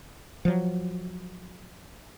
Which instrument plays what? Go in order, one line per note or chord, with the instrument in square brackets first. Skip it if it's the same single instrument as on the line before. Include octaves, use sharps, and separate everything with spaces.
[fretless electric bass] F3 F#3